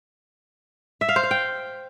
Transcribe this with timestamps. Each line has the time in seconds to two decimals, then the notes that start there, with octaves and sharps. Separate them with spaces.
1.01 E5
1.09 F5
1.16 C5
1.23 F5
1.31 G5